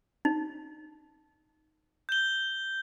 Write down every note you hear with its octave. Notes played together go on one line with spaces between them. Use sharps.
D#4
G6 G7